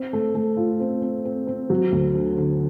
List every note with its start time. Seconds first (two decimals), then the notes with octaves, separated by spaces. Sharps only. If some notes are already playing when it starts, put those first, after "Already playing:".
Already playing: C4
0.13 A3
0.35 A3
0.57 F4
0.80 C4
1.02 C4
1.25 C4
1.47 C4
1.70 F#3
1.92 D2
2.15 D3
2.37 D3